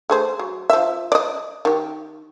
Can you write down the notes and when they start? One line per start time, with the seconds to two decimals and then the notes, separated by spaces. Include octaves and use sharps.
0.10 A3 G#4 C5
0.39 F#3
0.70 F3 E5
1.12 D5 D#5
1.65 D#3 G4